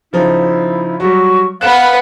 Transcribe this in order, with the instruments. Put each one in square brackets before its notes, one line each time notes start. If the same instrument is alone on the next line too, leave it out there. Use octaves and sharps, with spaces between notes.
[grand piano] C#3 F3 D#4 [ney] E4
[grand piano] F#3 G3 [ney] C#6
[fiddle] B3 B4 [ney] F5 [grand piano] F#6 E7